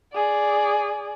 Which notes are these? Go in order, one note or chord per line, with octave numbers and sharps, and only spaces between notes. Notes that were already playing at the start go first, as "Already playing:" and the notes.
G#4 D5